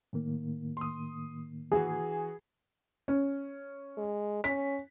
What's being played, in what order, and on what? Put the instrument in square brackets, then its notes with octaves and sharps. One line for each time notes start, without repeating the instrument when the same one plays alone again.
[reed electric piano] A2 D#3 A#3
[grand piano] C6 D#6
[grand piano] E3 F#4 [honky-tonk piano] G#4
[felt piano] C#4
[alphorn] G#3
[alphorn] C#4 [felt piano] B6